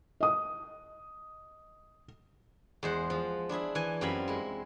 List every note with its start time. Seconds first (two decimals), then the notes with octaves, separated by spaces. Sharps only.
0.21 D#5 D#6
2.83 E2 G#3 C5 F#5
3.10 F3
3.49 D4 E4 G#4 E5
3.75 E3 G#5
4.01 F#2 G3 C4 F4 G#5 B5
4.28 G#3 E4